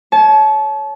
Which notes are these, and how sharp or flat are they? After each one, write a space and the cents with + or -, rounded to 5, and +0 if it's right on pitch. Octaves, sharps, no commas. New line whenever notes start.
C#5 +5 A5 -30